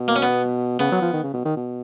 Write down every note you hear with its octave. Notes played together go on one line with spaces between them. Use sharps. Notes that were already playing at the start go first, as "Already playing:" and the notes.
Already playing: B2
A#3
C#4
B3
C#3 B3
F#3
F3
D#3
C#3
B2
D#3
B2